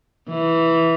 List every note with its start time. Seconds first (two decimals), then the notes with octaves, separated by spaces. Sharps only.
0.29 E3